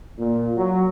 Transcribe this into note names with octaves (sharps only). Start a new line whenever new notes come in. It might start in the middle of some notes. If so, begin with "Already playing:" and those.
A#2
F#3